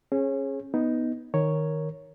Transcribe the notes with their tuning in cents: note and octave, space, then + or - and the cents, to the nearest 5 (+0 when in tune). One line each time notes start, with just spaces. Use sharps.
C#4 -25 G#4 +0 C#5 -30
B3 +0 D#4 +5
D#3 +0 A#4 +0 C#5 -5